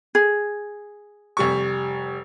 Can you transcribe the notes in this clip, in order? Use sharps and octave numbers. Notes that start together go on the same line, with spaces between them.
G#4
F1 G3 C#6